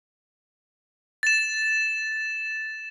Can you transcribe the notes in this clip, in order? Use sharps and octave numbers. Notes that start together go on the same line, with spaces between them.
A6 E7